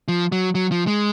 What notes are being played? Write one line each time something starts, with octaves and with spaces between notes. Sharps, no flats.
F3
F#3
F#3
F3
G#3